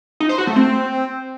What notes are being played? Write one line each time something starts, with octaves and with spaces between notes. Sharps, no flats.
D#4
C5
F#4
A3
C4